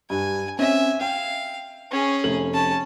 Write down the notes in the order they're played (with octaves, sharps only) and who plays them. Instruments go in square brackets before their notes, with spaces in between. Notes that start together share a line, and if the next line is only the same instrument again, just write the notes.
[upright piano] G2 [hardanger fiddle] G#5
[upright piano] C4 C#4 [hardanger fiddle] E5 G#5
[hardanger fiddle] F5 [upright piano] G5
[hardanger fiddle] C#4 G#4
[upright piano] F1 A3 F#7
[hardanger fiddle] C#4 A5